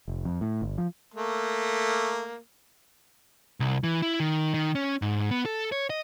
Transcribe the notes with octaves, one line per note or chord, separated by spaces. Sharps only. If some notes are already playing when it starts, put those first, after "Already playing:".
F1
F2
A2
G1
F3
A3 A#3
C2
E3
E4
D#3
D#3
C#4
G#2
B3
A4
C#5
D#5